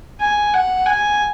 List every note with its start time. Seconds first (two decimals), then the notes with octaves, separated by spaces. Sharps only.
0.20 G#5
0.53 F#5
0.86 G#5